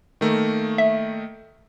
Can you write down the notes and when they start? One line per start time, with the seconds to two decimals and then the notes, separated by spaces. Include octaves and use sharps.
0.21 D#3 A3 A#3
0.78 E5